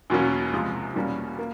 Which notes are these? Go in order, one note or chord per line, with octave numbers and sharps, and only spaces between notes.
E2 B2 F#3 A#3 C#4
C#2 C3 F3 G#3
E2 B2 G3 A#3 C#4
A#3